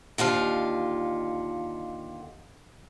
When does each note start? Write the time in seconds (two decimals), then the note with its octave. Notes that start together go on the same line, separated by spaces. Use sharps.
0.18 D#2 D3 F4 F5